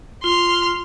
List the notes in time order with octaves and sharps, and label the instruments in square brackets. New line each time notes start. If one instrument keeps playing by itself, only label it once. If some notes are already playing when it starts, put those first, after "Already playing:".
[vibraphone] F4 [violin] C6 F6